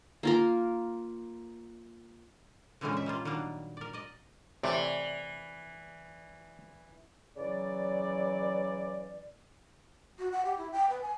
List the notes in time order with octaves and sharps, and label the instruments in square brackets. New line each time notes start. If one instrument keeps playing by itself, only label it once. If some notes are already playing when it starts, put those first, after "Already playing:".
[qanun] A#3 F4 A#4
[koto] A#2 D3 E3 G#3 C4 C#4
C#3 E5
G3 A#3 F4
D#3 F#3 G3 A#3 D4
A#4 D5
D5 D#5
[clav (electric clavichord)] C3 A3 [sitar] E3 [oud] D5
[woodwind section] C#3 E3 F#3 D5
[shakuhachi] F#4
F#5
G4
E4
G5
B4
G#5